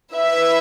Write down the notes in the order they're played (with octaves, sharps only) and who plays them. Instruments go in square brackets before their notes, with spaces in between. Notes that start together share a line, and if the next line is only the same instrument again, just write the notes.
[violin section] E4 B4 E5